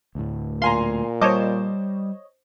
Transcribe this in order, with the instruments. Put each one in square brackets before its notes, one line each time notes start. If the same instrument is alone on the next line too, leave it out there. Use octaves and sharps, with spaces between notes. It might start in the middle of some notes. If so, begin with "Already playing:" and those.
[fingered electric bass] D2 A2
[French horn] A#2 [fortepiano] F5 G#5 A#5 [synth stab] C6
[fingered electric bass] G3 [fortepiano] C5 A5 D6 [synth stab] C#5 D#5